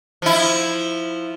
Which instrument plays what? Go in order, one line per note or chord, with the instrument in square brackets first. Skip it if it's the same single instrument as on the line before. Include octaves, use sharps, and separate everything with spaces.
[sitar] F3 E4